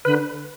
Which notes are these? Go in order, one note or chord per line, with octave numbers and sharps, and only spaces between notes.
D3 B4